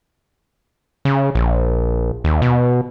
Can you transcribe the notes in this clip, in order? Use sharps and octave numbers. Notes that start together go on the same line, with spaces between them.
C#3
A#1
D#2
B2